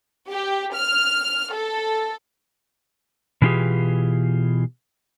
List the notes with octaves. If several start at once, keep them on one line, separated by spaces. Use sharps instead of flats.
G4
F6
A4
B2 E3 C#4 F4 G4 G#4